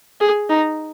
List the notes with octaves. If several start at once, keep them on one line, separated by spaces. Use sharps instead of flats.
G#4
D#4